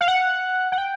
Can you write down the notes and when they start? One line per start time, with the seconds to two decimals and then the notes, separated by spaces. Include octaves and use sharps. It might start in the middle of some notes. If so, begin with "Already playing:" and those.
0.01 F5
0.08 F#5
0.72 F#5
0.78 G5